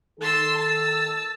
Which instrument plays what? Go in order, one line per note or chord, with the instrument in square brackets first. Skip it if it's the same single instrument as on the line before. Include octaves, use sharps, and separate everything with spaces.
[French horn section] D#3 A4 [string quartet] A5 C6 E6
[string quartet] A5 E6